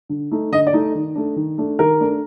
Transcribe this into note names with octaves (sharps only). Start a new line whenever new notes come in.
D3
A3 D#4
D3 D#5
D5
A3 D#4
D#3
A3 D4
D#3
A3 D4
D#3 A#4
A3 D4